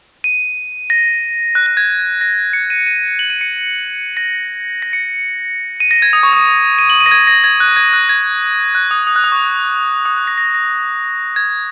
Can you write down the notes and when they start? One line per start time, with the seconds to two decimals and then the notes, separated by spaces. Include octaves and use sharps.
0.24 D#7
0.90 A#6
1.55 F#6
1.66 F#6
1.77 G#6
2.21 A#6
2.53 C#7
2.70 D#7
2.87 D#7
3.08 D#7
3.19 F#7
3.30 D#7
3.41 C#7
4.17 A#6
4.82 A#6
4.93 C#7
5.80 D#7
5.91 A#6
6.02 G#6
6.13 D#6
6.23 C#6
6.33 D#6
6.79 D#7
6.90 F#7
7.00 D#7
7.06 A#6
7.11 G#6
7.27 A#6
7.44 G#6
7.60 F#6
7.76 G#6
7.93 F#6
8.09 G#6
8.75 F#6
8.91 D#6
9.07 D#6
9.16 F#6
9.24 D#6
9.32 C#6
10.05 D#6
10.17 F#6
10.27 A#6
10.38 A#6
10.54 A#6
11.36 G#6